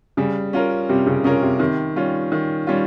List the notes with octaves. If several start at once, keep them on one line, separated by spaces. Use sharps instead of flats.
C#3 G3
C#4 F4 A#4
C3 G3
C#3
C#3 C#4 F4 A#4
C3
C3 D#3
G3 C#4 F4
D#3
G3 C#4 F4